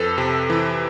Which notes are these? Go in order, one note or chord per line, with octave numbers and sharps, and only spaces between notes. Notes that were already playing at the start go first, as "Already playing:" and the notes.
Already playing: F2 A4 B4
C3
E3